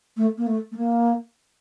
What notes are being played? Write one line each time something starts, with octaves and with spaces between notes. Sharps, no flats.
A3
A#3
A3
A3
A#3